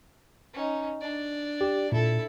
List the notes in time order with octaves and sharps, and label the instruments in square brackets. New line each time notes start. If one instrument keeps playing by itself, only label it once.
[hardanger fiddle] C#4 D#4
D4 D5
[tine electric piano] G4
[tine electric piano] A#2 [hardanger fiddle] E4 A4